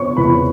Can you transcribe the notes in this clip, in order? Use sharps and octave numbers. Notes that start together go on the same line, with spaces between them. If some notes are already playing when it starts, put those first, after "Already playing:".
Already playing: C#5 C#6
E2 B4 B5